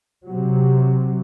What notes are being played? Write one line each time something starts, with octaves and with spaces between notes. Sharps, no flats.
C3 F#3